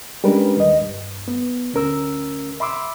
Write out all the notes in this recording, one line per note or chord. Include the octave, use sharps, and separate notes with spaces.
G3 G#3 C#4 D4 A#4 B4
D#2 D#5
G2
B3
D2 C#4 A#4 E6
E5 B5 C6 D6 E6